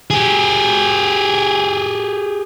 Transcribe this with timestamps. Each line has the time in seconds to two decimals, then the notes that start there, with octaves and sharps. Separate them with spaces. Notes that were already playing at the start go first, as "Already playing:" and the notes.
0.10 G4 G#4